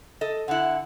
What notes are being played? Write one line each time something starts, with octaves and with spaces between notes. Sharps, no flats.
A4 D#5
D3 E4 F#5